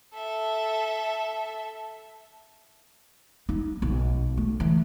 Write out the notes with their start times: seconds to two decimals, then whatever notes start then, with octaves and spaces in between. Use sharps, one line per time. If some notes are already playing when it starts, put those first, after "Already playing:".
0.14 A4 E5
3.49 D#4
3.82 B1
4.37 A3
4.60 E3